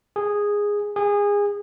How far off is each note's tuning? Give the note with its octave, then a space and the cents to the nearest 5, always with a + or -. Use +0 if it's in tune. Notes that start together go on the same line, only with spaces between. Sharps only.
G#4 -10
G#4 -25